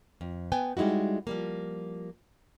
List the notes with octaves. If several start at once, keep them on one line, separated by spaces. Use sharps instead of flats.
F2
B3 B4 G5 G#5
G3 G#3 D#4 E4 F#4
F3 G3 A#3